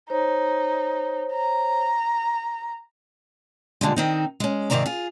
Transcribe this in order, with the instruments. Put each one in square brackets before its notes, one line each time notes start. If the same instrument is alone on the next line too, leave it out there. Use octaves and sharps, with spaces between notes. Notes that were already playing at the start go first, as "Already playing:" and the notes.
[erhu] D#4 [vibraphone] C5 C#5
[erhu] A#5
[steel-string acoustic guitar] A#2 D3 G3 G#3
D#3 C4 D#4
G#3 C#4
G#2 C3 D#3 C4 D5 A#5
F4 G#4